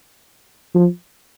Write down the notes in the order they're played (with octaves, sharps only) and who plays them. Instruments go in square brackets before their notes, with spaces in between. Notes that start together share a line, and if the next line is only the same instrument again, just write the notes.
[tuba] F3